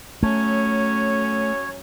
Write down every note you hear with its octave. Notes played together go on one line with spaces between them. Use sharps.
F#3 A3 C#4 C#5